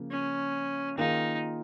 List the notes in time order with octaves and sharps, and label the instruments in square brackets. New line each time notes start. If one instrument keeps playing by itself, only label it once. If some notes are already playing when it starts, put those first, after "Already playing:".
Already playing: [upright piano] C#3 F3 A#3
[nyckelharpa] C#4
[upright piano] D#3 A#3 F4 G#4 [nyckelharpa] D#4